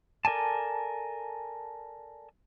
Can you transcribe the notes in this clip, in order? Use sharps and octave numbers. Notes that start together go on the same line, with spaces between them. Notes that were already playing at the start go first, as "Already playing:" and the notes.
A4 A#4 D5 G#5 A5